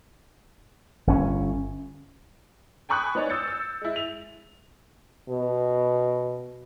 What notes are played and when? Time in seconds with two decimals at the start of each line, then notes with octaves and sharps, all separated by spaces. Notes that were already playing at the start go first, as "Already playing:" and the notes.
1.07 G1 C#4
2.89 G5 G#5 B5 C#6 D#6 F#6
3.15 B3 D#4 C#5 D5
3.30 D#6 E6 G6 A6 C#7
3.48 E6
3.81 G#3 E4
3.96 F7
5.29 B2